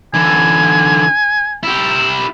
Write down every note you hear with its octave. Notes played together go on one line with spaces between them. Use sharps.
D3 E3 G#5
E4 G4